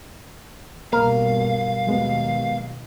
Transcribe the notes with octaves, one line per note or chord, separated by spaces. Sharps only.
B1 G2 B2 A#3 A#4 F5
D#2 B2 F#3 G#3 B3